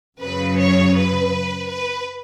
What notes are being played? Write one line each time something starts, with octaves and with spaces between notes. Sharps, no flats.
F#2 C#3 F#3 B4
C#5
B4
B4